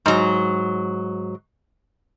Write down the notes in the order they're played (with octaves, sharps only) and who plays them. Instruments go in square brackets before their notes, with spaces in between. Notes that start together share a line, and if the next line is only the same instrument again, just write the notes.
[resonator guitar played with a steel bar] G#2 F#3